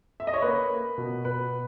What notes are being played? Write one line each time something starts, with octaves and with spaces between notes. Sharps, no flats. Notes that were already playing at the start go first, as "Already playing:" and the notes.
E5
D#5
C#5
A#3 B4
A#3
B2
B2 B4